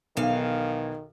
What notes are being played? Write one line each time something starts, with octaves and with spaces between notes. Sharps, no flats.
B1 D#3 E3 F5